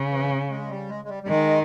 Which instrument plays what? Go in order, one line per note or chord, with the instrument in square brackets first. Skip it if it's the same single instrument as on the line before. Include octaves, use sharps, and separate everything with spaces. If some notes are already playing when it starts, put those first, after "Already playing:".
Already playing: [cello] C#3
[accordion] E3
G#3
G3
G#3
G#3
G3
G3
[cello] D#3 [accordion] G#3